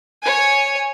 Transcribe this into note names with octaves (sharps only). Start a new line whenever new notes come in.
C#5 G#5